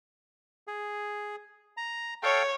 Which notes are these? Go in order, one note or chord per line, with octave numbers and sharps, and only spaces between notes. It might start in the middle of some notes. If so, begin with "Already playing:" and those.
G#4
A#5
A4 C#5 F5 G5